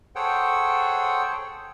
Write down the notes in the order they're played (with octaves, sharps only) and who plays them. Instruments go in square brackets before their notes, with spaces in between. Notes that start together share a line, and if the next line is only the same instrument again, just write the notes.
[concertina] G#4 A4 C5 C#5 F#5 G5